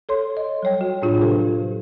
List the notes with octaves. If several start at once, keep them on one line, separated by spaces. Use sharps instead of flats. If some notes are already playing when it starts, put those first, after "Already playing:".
A4 C#5 C6
D#5
F#3 G3 C#5 G5
F#4
A2 D4 F4 G#4
C3 F#3 F#4 G4 A4 C5